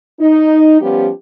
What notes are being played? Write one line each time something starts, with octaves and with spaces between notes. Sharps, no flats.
D#4
F3 G3 B3 C#4 G4